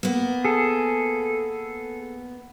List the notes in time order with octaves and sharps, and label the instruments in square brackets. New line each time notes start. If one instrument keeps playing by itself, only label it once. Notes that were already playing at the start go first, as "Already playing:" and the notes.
[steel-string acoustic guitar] A#3 B3
[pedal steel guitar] G#4 A4